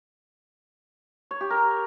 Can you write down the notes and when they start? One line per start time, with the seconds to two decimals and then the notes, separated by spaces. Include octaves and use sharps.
1.31 C#5
1.41 G4
1.50 A#4